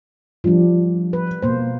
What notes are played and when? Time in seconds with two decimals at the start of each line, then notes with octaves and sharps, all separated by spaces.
0.44 F3 G3 D4
1.13 B4
1.42 B2 A#3 C5